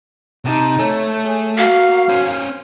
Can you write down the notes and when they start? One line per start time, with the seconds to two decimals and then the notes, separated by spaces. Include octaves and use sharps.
0.45 C3 D#4 A5
0.79 A3 C#5 A5
1.25 G#4
1.58 A#3 F#4 F5 F6
2.09 C#4 C5